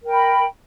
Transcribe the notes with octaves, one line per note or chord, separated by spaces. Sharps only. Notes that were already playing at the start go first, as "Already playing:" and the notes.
A#4 G5 B5